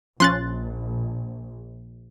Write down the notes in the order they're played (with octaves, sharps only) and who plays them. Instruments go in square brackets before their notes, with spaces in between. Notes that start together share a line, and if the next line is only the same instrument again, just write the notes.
[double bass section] A#1 [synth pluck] F3 C#4 [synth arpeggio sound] C6 F#6 A6